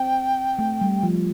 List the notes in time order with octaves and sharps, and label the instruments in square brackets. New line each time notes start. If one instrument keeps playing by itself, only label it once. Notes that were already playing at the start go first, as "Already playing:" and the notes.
Already playing: [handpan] C4 [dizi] G5
[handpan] A3
G3
F3